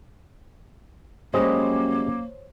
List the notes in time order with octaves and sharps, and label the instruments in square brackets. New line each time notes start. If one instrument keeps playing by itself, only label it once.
[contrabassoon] F#2 [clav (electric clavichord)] G3 G#3 D#5 [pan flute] A#3 [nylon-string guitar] C5 C#5